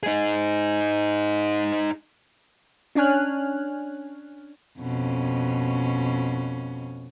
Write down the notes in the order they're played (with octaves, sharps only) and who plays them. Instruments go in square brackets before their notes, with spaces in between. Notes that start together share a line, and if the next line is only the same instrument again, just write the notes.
[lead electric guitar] D#4 G#4
[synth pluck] C#4 D4 C#5 G#5 F6 F#6
[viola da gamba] F2 B2 C#4